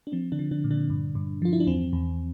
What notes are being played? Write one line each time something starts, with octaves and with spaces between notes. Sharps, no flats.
D4
F3 C4
D3 D4
F3
D3 D4
A#2
D3 D4
G2
G2
F3 F4
E4
D4
E2 C4
E2